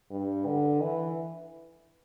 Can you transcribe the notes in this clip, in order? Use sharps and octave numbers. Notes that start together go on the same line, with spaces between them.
G2
D3
E3